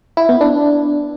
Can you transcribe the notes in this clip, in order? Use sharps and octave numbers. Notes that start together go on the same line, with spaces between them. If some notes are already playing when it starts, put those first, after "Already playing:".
E4
B3
D4